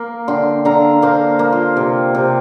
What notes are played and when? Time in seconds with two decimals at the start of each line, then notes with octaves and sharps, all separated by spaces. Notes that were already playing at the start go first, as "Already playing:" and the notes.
Already playing: A#3 F5
0.28 D3 G5 C6
0.65 D3 F5 A#5
1.02 A#3 C5 F5
1.39 A#3
1.52 F4
1.77 C3
2.15 C3